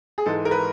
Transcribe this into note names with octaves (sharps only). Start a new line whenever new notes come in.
G#4
G#2 E3 G#3 A4
A#4
B4